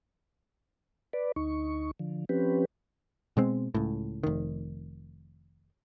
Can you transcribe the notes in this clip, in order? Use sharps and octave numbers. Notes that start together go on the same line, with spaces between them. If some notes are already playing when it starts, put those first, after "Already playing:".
B4 D5
D2 D#4 C#6
D3 F3
F3 C4 C#4 G4 B4
B2 G#3 C4
C#2 A2
F1 D#3